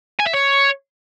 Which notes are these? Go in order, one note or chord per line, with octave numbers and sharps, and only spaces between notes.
G#5
E5
C#5